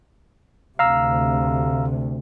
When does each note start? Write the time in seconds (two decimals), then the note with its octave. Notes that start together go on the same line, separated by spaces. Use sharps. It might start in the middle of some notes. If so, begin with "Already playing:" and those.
0.79 D2 C3 F5 A#5 E6